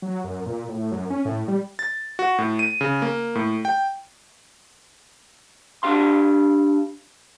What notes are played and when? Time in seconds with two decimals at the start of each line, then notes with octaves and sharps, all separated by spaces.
0.02 F#3
0.24 F#2
0.46 A#2
0.69 A2
0.92 F#2
1.10 C#4
1.25 A2
1.48 G3
1.79 A6
2.19 F#4
2.38 A2
2.59 D#7
2.81 C#3
3.02 A#3
3.35 A2
3.65 G5
5.83 D4 G4 F5 C6